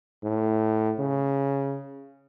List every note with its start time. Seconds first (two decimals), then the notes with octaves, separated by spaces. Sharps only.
0.24 A2
0.99 C#3